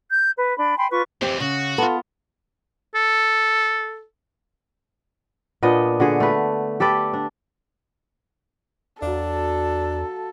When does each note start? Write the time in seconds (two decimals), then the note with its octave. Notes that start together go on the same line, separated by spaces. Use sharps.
0.10 G6
0.38 B4
0.58 D4 B5
0.77 G5 G#5 B5 C6
0.91 F4 B4 C#6
1.22 F2 E3 C4 G4 C5
1.40 C#3 F#4
1.78 B3 F4 A4
2.95 A4
5.63 A#2 B3 D4 D#5
6.00 D3 F#4 G#4
6.20 A3 B4
6.80 G4 A4 B4 D5
7.14 D4
9.02 E2 F#3 D4 A4 F5